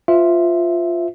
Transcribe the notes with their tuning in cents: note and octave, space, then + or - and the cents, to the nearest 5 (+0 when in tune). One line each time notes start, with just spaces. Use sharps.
F4 +0 C5 -45 E5 +0